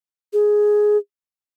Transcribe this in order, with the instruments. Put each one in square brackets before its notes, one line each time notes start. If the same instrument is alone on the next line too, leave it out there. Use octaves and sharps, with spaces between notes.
[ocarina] G#4